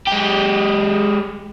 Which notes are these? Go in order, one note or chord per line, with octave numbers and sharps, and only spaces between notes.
G#3 G4